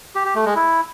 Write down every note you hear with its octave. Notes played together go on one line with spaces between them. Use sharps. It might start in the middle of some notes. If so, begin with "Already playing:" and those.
G4
G4
A3
G#3
E4